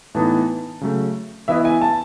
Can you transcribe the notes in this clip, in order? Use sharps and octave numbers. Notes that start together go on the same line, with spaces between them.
A2 E3 B3 D#4 A5
C#3 F#3 A3
E3 B3 E4 B4 D#5 E5
G#5
A5